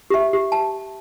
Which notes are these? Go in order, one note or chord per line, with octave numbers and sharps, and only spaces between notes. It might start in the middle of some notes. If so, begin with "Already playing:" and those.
G4 E5
G4
A5